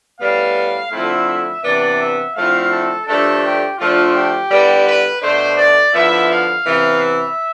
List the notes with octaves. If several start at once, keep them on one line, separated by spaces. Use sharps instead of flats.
A2 G3 B3 F5
D3 F3 A3 C4 E4 E5
C3 E3 B3 D4 D5
E5
D3 F3 A3 C4 E4 F5
A4
G2 F3 A3 D4 A4
G4
D3 F3 A3 D4 F4
G4
D3 G3 B3 E4
B4
B2 A3 D4 C5
D5
D3 F3 B3 E4 E5
F5
C3 E3 B3
E5